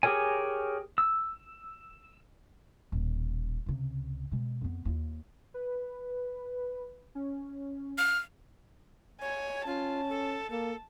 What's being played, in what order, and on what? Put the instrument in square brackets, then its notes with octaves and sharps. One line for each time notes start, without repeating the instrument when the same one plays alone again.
[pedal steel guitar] G4 G#4 A#4 C#5 G#5
E6
[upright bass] D#1 B2
C#2 C3
B2 G#3
F2 B3
D#2 F4
[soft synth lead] B4
C#4
[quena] F6
[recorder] C#5 [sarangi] G#5
[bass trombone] C#4 [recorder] F4 [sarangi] A5
[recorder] A4
[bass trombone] A#3 [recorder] A4